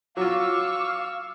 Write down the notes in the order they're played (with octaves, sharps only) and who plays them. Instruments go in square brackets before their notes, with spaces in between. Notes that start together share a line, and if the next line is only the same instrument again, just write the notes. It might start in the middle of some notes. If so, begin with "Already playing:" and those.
[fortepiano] F#3 F4 [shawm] F5 [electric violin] C#6 E6 [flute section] D6